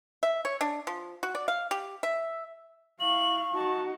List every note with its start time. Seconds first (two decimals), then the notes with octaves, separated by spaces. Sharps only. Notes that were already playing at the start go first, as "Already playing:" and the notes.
0.23 E5
0.45 C#5
0.61 D4
0.87 F3
1.23 F#4
1.35 D5
1.48 F5
1.71 G4
2.03 E5
3.00 E4 F5 C#6 F#7
3.54 D#4 F#4 A5